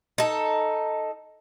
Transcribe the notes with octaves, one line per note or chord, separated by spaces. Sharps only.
D#4 A4